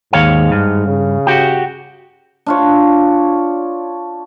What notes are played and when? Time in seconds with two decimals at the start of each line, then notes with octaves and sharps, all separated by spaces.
0.13 D#2 G#2 C#5 F5
0.52 G2
0.87 C#3
1.27 F#4 G4
2.46 D4 F4 C#5